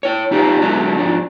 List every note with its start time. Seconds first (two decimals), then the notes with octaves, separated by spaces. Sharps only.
0.03 E4 C#5
0.31 C#3 D#4 F4 G4 D5
0.62 D3 F#3 G#3 E4 E5 A#5
0.98 G#2 F3 D4